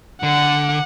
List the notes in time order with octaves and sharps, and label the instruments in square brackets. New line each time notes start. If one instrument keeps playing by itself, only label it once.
[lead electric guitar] D3 [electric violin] F#5